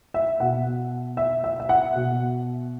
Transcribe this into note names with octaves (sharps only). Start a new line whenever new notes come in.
E5
B2 F#5
E5
E5
E5
F#5
B2